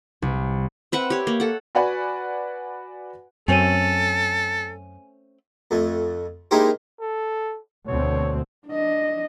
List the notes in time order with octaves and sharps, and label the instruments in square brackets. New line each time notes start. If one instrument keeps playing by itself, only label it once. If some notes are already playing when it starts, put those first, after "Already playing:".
[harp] C2
[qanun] C4 B4 E5 F#5
G4 C#5
A#3
A4 F#5
[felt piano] F#4 B4 D5 F#5 G#5 B5
[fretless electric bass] F#2 [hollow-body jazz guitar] A3 C4 C#4 [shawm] A4 [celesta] G#5 D#7
[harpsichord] F2 A3
G#3 A#3 D#4 E4 G4 C5
[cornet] A4
[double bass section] D2 B2 C4 [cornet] C#5
[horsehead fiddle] D4 D#5